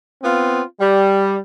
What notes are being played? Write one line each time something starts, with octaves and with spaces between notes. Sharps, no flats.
B3 C4 F4
G3